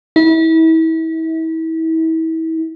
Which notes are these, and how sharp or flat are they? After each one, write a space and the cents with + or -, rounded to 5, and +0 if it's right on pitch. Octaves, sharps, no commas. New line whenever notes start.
E4 -35